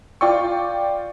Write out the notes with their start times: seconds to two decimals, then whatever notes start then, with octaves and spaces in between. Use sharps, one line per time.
0.21 F4 D5 G5 C#6